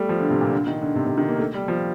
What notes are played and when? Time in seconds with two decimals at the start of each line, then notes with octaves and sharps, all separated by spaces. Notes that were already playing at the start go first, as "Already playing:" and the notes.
Already playing: G3 A3
0.09 F3
0.20 D3
0.30 C3
0.41 A#2
0.53 D3
0.67 D#3
0.82 D3
0.95 C3
1.06 C3
1.18 D#3
1.29 A#3
1.39 A3
1.54 G3
1.68 F3